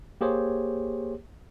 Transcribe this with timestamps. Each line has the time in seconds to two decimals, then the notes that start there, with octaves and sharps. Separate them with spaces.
0.21 A#3 G4 G#4 C5 C#5